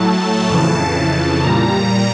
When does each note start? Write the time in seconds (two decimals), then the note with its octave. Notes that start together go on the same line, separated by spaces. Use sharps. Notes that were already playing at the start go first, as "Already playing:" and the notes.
Already playing: A2 F#3 A3 A5
0.48 F2 C#3 E3
1.42 A#2 G3 A#5